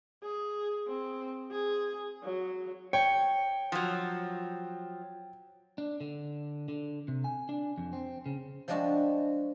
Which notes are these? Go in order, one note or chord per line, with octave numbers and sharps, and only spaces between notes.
G#4
C4
G#4
F#3
C#5 G5
F3 F#3
D4
D3
D3
C3
G#5
D4
F2
C4
C#3
F3 G3 G#3 D4 F#4